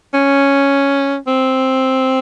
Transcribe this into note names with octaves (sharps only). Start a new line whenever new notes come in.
C#4
C4